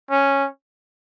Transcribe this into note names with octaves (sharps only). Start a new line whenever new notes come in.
C#4